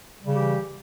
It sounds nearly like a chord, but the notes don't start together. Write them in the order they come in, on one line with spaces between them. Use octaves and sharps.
G3 C#3 G4 E3